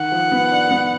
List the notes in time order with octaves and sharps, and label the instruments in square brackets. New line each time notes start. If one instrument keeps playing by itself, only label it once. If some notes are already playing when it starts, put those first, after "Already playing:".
Already playing: [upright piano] D#3 [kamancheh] F#5
[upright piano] F3
B3
D4
B3